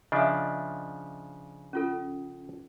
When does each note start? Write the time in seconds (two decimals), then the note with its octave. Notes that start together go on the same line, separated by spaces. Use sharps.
0.12 C#3 F3 D4 D#5 E5
1.73 C#4 F4 A4